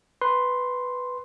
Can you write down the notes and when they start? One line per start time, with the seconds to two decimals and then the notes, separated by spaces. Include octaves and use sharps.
0.21 B4 C6